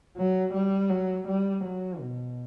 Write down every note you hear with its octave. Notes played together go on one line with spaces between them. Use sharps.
F#3
G3
F#3
G3
F#3
B2